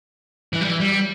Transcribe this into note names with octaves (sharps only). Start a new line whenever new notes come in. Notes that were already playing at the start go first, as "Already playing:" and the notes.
E3
G3
E3
G3